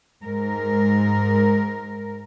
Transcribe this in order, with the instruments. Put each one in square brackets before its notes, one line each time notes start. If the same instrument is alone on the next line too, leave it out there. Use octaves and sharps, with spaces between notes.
[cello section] G#2 A#4